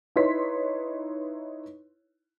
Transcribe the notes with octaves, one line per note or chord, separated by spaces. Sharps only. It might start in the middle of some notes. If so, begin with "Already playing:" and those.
D#4 E4 B4 C#5 C6 B6